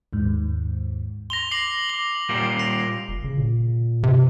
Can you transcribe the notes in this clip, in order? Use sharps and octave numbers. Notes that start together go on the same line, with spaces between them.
D#2 G#2
C6 A#6 F7 G7
D6 A#6 C7 F7 F#7
D6 F#7
A#2 G3 A#3
A#6 C7 F7
F#1
C#3
A#2
G2 C3